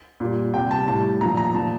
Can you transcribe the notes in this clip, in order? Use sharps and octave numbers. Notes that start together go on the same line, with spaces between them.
A#2 G3
C3 G3 G5
A5
A2 G3 A5
A#2 F3 A#5
A#5
A#2 F3 A5